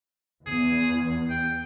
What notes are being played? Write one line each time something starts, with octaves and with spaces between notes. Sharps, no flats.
E2 G#4
G5